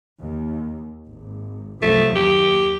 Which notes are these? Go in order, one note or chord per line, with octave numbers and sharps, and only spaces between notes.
D#2
G#1
C2 F#2 F3 A3
D#2 F#3 G4